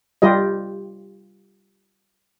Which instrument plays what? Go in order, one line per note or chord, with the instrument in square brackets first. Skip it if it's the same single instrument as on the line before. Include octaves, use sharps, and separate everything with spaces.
[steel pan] G3 F4 G4 D#5